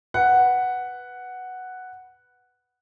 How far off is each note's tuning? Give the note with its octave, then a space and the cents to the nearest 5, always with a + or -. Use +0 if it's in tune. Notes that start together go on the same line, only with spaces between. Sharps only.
B4 +0 F#5 +0